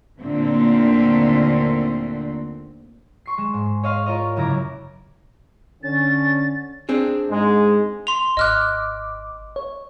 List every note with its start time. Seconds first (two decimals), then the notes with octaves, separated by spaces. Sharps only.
0.19 D#2 A#2 D3 A3 C4
3.26 C6 C#6 C7
3.38 G#3 E7
3.54 G#2
3.83 C#5 D#5 F5 C6
4.06 F4 A#4 C#5 D#5
4.36 F#2 C#3 E4 A#5 D6
5.83 D3 C#4 A6
6.89 C4 D4 G#4
7.30 G#2 G#3
8.07 C6 F7
8.37 G#1 D#5 D6 F6 F#6
9.56 C#5